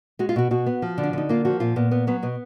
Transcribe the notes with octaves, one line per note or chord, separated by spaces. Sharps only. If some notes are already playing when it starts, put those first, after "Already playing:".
G#3 F#4
F4
B2 F#4
B2 F#4
B3
F3
D3
D4
D3 D#4
A#3 F4
F3 F#4
A#2 F4
A#2 B3
B3
F#3 B3
B2 B3